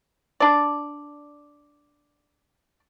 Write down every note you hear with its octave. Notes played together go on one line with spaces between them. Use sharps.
D4 D5